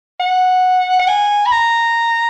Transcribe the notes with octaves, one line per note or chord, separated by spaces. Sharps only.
F#5
F#5
G#5
B5
A#5